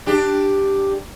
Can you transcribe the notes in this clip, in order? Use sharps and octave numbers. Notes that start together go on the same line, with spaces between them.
D4 G4